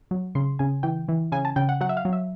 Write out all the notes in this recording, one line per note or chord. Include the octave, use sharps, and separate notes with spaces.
F#3
C#3 C6
C#3 G#5
E3 G5
E3
C#3 G#5
A5
C#3 G5
F#5
F#3 F#5
E5
F5
F#3
E5